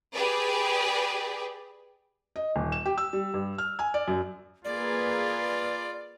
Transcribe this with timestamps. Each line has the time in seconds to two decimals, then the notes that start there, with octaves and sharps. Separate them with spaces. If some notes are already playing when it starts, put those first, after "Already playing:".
0.14 G4 G#4 B4 D5
2.36 D#5
2.56 D#1
2.72 E7
2.86 G4
2.98 E6
3.13 G3
3.34 G2
3.58 F6
3.79 G#5
3.94 D5
4.08 F#2
4.65 A#3 F4 G#4 B4 D5